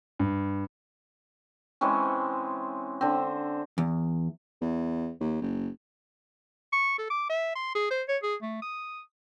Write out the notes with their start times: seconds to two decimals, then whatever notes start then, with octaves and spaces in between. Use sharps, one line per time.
0.20 G2
1.81 E3 G#3 C4 C#4
3.01 D3 C4
3.78 E2
4.61 E2
5.20 D#2
5.41 F#1
6.73 C#6
6.98 A4
7.10 D6
7.29 E5
7.56 C6
7.75 G#4
7.90 C5
8.08 C#5
8.23 G#4
8.42 A3
8.62 D#6